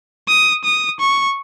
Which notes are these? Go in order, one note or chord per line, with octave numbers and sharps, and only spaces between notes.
D#6
D#6
C#6